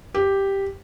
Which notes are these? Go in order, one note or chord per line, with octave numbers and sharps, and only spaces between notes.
G4